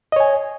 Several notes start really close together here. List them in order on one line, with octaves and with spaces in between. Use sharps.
D#5 C#5 G#5